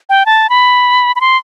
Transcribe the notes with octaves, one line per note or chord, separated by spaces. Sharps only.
G5
A5
B5
B5
C6